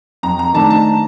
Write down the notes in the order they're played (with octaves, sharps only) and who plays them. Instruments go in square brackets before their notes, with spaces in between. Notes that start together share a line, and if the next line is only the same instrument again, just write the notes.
[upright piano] F2 [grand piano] A#5
[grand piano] A#5
[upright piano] D#3 A3 D4 [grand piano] A5
[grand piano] A5